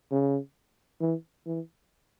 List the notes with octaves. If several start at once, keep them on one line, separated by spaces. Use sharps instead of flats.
C#3
E3
E3